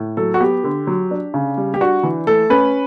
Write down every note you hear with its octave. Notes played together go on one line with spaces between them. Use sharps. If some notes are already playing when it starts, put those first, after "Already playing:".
Already playing: A2
F#3 A4
F#4
B3 G4
D3
F#3
D4
C#3
G3
G4
D4 F#4
E3
A3 A4
C#4 B4